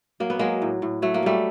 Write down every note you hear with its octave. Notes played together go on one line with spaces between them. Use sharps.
F#3 A#3
B3
F#3 G#3 A#3
A2
A2
F#3 A3
A#3
F#3 G3 A3